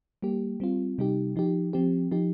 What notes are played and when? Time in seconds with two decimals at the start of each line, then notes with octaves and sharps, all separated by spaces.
0.22 G3 A#3 G4
0.60 G3 C4 F4
0.98 C3 G3 D#4 G4
1.36 F3 D#4 G4
1.73 F3 C4 G4
2.12 F3 D#4 G4